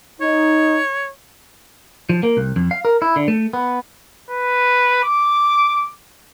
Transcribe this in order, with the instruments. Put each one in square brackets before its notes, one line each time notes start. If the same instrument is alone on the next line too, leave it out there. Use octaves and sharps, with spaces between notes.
[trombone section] D#4 [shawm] C#5
[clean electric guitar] F3
A#3
C2
F2
F5
A#4
E4
D3
A3
B3
[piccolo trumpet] B4
D6